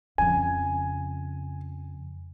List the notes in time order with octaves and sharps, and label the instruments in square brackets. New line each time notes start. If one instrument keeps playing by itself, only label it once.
[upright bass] F2 C#3 [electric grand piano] G#5